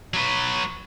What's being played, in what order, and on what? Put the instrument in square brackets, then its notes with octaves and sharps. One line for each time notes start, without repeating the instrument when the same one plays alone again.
[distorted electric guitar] F#3 B4